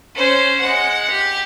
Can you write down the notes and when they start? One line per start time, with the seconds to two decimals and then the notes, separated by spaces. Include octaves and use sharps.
0.15 C#4 C5
0.60 G#3 F#5
1.11 G4